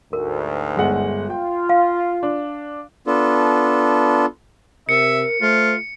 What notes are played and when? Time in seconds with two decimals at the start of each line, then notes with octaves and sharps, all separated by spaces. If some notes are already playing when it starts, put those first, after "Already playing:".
0.13 D2 G#2 A#4
0.76 G1 G#3 F#5
1.30 F4 G5
1.69 F5
2.23 D4
3.07 B3 D4 F4 A4
4.89 C3 A#4 E5 C#7
5.41 A3 F4 C5